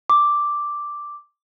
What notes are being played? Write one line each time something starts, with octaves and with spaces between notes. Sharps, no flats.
D6